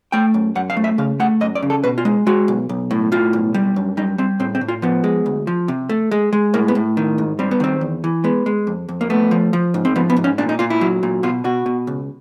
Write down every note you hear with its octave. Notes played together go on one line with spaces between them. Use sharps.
A3 G5
F#2
F#2 F#5
F5
A3
E5
C#3 F5
A3 F#5
F#2 D#5
D5
C#3
A4
B2 B4
F4
G#3
G#3 F#4
B1
B1
A2
A2 F4
B1
G3
F#2
G3 D#4
G3 C4
A2 C4
C4
A2
F4
F3 B3
G#3
D2
F3
C3
A3
G#3
G#3
A2 A#3
B3
A2
D#3
G#2
G3 C4
B3
D#3 C4
E2
E3
G#3 B3
G#3
F2
F2
A#3
A3 B3
F3
F3
G#2
C4
F3 B3
B3
G#2
C#4
A#2 D4
D#4
A#2 F4
E4
F#3
A#2
B2 F4
B2 F#4
B2
C#2